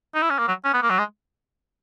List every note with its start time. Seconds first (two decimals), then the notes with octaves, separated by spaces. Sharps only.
0.15 D#4
0.22 E4
0.30 C#4
0.39 A#3
0.48 F#3
0.64 C#4
0.73 B3
0.82 A#3
0.90 F#3
0.98 G#3